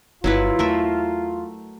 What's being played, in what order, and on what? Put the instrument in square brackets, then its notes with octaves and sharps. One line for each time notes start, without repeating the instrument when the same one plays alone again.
[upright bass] G1 C#3 [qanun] F#3 E4 B4 [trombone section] F4
[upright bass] E2 [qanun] A3 A#4 E5